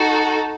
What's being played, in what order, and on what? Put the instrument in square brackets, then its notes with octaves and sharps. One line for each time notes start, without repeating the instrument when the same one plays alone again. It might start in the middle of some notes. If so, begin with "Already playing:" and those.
Already playing: [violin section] D#4 F#4 A4